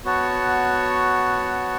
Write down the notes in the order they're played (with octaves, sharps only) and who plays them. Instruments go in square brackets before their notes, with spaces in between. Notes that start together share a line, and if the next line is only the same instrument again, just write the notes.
[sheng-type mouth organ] B3 F#4 C#5 F#5 A5